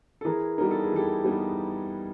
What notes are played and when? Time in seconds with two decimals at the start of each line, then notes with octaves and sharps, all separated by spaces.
0.21 A4
0.25 E3 G#4 A#4
0.58 G3 B3 D#4 A#4
0.71 A4
0.83 G#4
0.92 E3 G4 A4
1.24 G3 B3 D#4